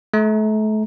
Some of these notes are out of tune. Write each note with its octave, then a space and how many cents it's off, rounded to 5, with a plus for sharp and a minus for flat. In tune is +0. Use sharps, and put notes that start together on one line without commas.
A3 -35 A#5 +0